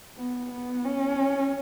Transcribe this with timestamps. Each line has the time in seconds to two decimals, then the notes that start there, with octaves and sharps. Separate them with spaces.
0.17 B3
0.51 B3
0.85 C#4